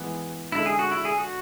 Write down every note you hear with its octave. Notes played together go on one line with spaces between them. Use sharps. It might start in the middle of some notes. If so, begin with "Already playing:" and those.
Already playing: E3 G#3 B3
D3 G#3 D4 E4
G#4
F#4
E4
G#4
F#4